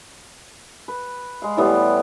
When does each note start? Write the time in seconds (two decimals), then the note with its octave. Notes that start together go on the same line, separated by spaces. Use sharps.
0.88 B4
1.42 G#3 F5
1.57 A2 E3 G3 B3